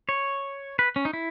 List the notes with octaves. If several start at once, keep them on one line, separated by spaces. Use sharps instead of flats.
C#5
B4
C#4
D#4
E4